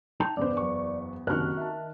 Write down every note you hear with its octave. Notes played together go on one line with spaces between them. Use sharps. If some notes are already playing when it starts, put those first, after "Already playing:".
D#4 G5 A5 F7
E2 G2 C#3 B3 C5 D5
F#1 C#6
F#1 C2 D#3 F#4 A#4 F6 F#6
E5 A5